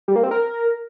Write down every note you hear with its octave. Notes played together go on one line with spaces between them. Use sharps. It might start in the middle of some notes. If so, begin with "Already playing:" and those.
G3
A#3
C4
A#4